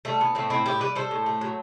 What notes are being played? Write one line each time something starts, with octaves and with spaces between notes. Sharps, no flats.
G3 A3
E3 B3
A2 A3 C4
A2 C4 E4
A2 E4 G4
G3 B4 D5
G3 A4 C5
A2
A3
F#3